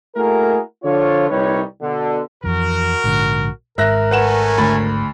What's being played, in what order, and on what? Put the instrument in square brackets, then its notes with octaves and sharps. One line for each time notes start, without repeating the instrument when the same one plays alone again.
[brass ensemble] A3 A#3 E4 F#4 G#4 A#4
D3 F3 F4 C#5
C2 A#2 G3 D#4 B4 C#5
B2 D3
[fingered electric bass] F2 E3 [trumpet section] F#4 A#4
[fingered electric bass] A#1 G#2 D3
[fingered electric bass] G#1 G#2 [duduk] A#4 [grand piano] E5 F#6 A#6
[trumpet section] A3 C#5 G#5 [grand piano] B4 F#5 E7
[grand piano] D2 B5 A6